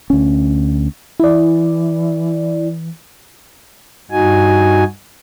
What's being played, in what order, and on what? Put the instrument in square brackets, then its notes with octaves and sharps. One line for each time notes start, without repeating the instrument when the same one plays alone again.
[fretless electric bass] D2 C#4
[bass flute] E3 [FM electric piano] E4 D5
[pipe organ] G2 D#4 F#4 G#5